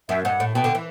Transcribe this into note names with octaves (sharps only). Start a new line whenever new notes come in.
F#2 E5
G2 F#5
A2
B2 G5
D3
E3